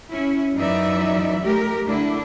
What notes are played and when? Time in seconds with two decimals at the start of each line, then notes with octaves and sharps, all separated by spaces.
0.10 C#4 E4
0.57 F#2 E3 D#4 D5 E5
1.43 A3 G4 A#4
1.86 D3 A3 D4 E4